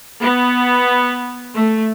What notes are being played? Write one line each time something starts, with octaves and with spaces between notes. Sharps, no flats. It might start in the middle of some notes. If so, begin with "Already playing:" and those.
B3
A3